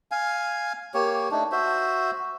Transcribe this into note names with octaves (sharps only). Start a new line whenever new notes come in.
F5 G#5
A#3 G4 C#5
A3 D4 D#4
F#4 C5 E5